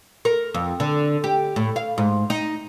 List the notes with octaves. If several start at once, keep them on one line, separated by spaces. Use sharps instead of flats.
A#4
F2
D3
G4
A2
F5
G#2
D#4